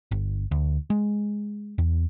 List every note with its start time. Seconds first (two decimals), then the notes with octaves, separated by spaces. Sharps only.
0.11 G1
0.51 D2
0.90 G#3
1.78 E2